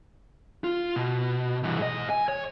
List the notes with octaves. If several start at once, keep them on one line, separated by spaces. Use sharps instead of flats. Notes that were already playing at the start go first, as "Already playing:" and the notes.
F4
B2
C2 E3
G#2 D#5
G#5
C#5